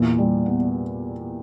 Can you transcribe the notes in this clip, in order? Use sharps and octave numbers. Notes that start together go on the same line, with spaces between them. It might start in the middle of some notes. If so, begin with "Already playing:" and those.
Already playing: E2 A#2
G3
B3